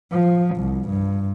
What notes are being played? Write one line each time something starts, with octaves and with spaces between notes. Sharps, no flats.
F3
C2
G2